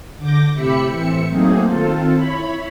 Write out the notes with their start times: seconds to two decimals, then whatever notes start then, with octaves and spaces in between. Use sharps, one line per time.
0.17 D3 D6 G6 A#6
0.53 A2 C3 G4 E5 B5 C#7
0.89 A2 E3 C4 E5 C#7
1.28 F#3 A3 A#3 C4 D#4 G#4
1.65 D#3 C4 F4 A4
2.14 E4 C#5 B5